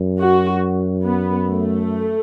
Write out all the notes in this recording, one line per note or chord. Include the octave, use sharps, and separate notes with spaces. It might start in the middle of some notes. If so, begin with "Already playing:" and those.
Already playing: F#2
F#4
B3
A3